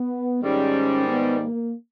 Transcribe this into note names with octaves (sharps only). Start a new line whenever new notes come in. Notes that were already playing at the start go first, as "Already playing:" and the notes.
Already playing: B3
G#2 D#3 G3 C#4
B3
A#3